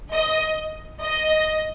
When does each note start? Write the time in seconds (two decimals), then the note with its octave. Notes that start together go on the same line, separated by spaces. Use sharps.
0.12 D#5
1.00 D#5